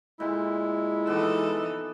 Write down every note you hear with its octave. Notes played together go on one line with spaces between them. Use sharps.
A#2 G#3 E4 A4
E3 B3 D#4 A4 A5 D6